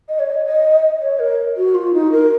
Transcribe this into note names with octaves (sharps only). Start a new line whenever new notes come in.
D#5
C#5
D#5
D#5
C#5
A#4
F#4
F4
D#4
A#4